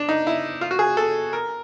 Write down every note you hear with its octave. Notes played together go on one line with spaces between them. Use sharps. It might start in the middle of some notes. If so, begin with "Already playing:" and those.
Already playing: D4
D#4
E4
F4
F#4
G#4
A4
A#4